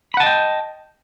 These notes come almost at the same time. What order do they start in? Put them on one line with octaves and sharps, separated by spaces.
B5 F#5 A5 D#5 G5